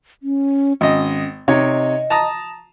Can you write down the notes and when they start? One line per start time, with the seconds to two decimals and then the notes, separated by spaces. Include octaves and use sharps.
0.23 C#4
0.81 G#1 C#4 D#5
1.48 C3 D#4 C#5 D#5
2.10 A5 A#5 D#6